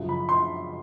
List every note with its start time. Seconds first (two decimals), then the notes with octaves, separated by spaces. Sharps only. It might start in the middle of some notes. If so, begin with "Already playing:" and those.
Already playing: F#2 C#3 F3
0.09 B5
0.29 C6